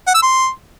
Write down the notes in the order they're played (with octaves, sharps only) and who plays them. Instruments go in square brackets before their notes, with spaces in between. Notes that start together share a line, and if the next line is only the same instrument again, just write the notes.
[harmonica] F#5
E6
C6